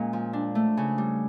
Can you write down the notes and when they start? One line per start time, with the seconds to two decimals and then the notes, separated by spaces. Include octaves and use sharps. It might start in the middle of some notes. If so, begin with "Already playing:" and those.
Already playing: A#2 G#3 C#4
0.13 F3
0.33 D4
0.55 A3
0.77 C#3
0.98 G3